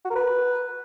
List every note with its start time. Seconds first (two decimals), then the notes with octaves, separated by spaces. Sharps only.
0.05 F#4
0.10 A#4
0.15 B4